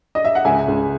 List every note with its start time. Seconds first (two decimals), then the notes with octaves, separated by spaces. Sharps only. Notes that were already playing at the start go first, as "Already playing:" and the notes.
0.15 D#5
0.25 E5
0.35 F#5
0.45 C#2 E5 G#5
0.68 C#2